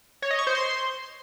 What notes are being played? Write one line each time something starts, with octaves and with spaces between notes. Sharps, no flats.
C#5
D#5
C#6
C5
C6